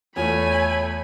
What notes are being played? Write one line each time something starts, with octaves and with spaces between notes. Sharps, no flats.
E2 A3 F4 C#5 G#5 B5